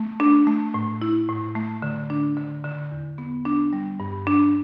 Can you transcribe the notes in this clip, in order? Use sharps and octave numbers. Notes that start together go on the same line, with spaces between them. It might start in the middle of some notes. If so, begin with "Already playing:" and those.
Already playing: A3
D4
A3
A2
E4
A2
A3
D3
D4
D3
D3
E2
B3
D4
G3
G2
D4